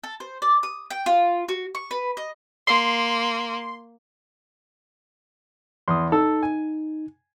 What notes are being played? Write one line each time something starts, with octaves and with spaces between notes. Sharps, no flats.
A4
C5
D5
D#6
G5
F4
F#4
C#6
B4
D#5
A#3 C6
E2 C6 D#6
D#4 A4 E6
G#5